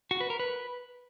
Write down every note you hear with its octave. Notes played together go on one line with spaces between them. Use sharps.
F#4
B4
A#4
B4